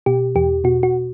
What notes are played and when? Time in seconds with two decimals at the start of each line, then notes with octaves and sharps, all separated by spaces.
0.06 B2 G4
0.35 E2 G4
0.64 B2 F#4
0.83 F#4